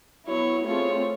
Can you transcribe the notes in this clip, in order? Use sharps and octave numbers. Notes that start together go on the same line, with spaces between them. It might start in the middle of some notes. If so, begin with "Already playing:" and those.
F#3 B3 E4 C#5
A3 C4 F4 G#4 C#5